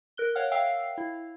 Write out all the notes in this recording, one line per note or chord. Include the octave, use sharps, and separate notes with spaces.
A#4 F#6 G7
C#5 F5 F#5 F6
E5 F5 G5 E6 C7
E4